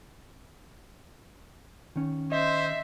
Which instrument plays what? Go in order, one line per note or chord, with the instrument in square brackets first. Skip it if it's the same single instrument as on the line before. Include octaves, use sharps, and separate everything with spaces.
[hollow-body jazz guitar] D#3 C#4
[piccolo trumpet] C5 [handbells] D#5 [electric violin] E5